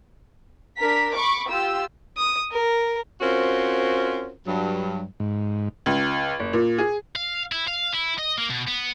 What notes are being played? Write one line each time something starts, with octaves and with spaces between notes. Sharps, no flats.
D4 A#4 B6
B5 C#6 D6
F4 G4 E6
D#6
A#4
C4 C#4 F4 F#4 A#4 C5
G2 F#3
G#2
C#2
F#1
A#2
G#4
F5
E4
F5
E4
D#5
A#3
B2
B3